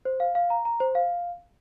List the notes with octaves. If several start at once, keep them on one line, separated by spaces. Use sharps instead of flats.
C5
F5
F5
A#5
A#5
C5
F5